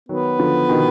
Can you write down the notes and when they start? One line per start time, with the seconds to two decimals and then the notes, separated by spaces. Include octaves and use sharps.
0.09 D#3 F#3 B3
0.39 D3 F3
0.69 B2 D#3